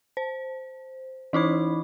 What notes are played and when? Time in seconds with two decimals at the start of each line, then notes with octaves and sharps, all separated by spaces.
0.17 C5
1.33 E3 D#4 E4 B5